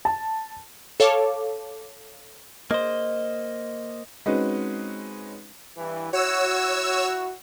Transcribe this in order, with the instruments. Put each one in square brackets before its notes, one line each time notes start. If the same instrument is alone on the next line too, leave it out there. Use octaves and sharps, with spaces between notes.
[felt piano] A5
[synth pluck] A4 C#5 F5 A5 D6
[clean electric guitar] A#3 C5 [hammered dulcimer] D#5
[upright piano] G#3 C4 C#4 D#4 F#4 B4
[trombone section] G2 E3
[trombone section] E4 F#4 [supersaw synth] C#5 E6